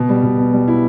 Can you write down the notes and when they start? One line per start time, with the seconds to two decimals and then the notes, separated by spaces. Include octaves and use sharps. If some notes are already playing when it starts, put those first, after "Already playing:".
Already playing: B2
0.09 G3
0.23 B2
0.38 B2
0.53 G3
0.68 E4